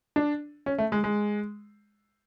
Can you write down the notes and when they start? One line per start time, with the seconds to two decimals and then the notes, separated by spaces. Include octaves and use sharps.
0.16 D4
0.66 C#4
0.78 A3
0.92 G#3
1.04 G#3